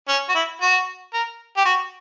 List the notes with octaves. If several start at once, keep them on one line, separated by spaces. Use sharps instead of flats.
C#4
F#4
E4
F#4
A#4
G4
F#4